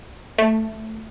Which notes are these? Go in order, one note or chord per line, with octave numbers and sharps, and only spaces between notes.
A3